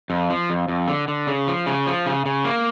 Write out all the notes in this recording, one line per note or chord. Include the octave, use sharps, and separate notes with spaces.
F2
F3
F2
F2
D3
D3
C#3
F3
C#3
F3
C#3
C#3
A#3